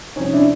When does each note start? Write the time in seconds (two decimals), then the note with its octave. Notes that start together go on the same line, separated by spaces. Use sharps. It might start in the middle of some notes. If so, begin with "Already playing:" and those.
0.16 C3 F3 C#4 D#4
0.33 D4 E4